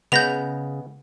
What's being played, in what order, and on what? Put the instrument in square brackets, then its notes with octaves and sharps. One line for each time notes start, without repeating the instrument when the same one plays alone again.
[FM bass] C#3 [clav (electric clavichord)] G#3 B3 [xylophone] G6 A#6 F7